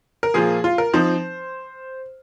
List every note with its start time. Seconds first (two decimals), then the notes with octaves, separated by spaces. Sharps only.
0.23 A#4
0.34 A#2 F3 A#3 F4 G#4
0.64 F4
0.78 A#4
0.93 F3 C4 D#4 C5